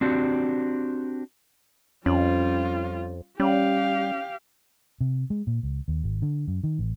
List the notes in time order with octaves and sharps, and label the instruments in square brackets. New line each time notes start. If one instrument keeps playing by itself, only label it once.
[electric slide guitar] C4 D4 F#4 G4
[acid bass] F2 [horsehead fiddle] G3 F4 [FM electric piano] C#4
[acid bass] G3 [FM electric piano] C#4 [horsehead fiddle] G4 F5
[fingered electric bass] C3
G#3
A#2
C#2
D#2
G#1
D3
F#2
D#3
A1